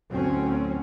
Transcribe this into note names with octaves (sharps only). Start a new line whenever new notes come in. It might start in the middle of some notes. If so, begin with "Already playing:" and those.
D2 A2 F#3 C4 C#4